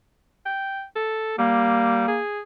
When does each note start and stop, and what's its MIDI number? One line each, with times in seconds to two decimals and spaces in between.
0.45 0.83 79
0.96 1.34 69
1.39 2.06 55
1.39 2.18 58
2.08 2.40 68